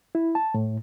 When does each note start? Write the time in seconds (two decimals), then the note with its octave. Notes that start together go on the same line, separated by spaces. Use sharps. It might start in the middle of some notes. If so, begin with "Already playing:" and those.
0.15 E4
0.35 A5
0.54 A2